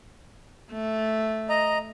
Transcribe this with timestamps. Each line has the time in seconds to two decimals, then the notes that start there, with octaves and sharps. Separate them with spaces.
0.72 A3
1.49 D#5 A#5